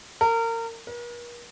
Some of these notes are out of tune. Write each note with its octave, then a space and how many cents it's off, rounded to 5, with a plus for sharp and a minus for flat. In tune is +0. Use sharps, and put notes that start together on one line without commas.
A#4 -30
A#4 +45